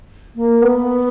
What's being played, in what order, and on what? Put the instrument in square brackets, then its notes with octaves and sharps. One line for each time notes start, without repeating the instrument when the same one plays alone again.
[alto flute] A#3
B3